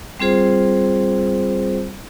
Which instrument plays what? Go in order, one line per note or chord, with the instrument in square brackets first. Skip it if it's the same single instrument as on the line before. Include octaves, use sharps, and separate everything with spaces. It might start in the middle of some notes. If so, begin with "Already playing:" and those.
[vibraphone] G3 C4 F4 G#4 C5